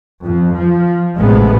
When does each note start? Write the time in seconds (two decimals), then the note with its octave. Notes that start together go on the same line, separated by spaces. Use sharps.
0.24 F2
0.55 F3
1.16 A1 E2 A2 C3 G#3 B3